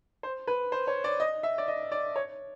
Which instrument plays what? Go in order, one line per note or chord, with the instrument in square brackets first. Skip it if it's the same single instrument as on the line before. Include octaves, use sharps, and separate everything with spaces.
[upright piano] C5
B4
C5
C#5
D5
D#5
E5
D5
D#5
D5
C#5